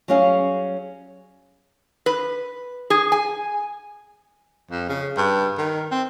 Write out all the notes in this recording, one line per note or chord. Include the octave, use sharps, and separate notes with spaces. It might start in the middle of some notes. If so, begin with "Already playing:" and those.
F#3 G3 C#4 G#4 F5
B4
G#4
G#5
F2
C#3
G2
D#3
C4